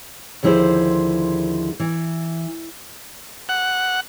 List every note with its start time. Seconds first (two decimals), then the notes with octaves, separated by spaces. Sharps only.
0.43 D#2 D3 F3 E4 G#4 C5
1.80 E3
3.49 F#5